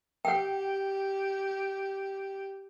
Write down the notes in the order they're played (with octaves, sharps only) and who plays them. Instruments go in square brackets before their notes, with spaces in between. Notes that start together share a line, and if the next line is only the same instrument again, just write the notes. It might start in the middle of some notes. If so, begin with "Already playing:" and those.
[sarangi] G4 [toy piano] F#5 G5